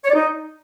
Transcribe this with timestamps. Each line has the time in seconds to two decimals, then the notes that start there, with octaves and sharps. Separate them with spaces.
0.05 C#5
0.10 D5
0.15 D#4